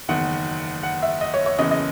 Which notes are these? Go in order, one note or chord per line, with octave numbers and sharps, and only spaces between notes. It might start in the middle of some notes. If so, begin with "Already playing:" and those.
F#1 E2 D#3 F#5
F#5
E5
D#5
C#5
C#5
F#1 E2 C#3 E3 D#5
D#5